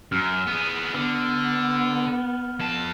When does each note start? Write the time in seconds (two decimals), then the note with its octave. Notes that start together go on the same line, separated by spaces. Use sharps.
0.12 F#2 F6
0.47 B3 G#4
0.94 D3 B3
2.60 F2 A5